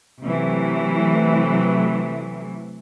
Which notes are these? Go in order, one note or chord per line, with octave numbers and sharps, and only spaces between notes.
C3 E3 F#3 A3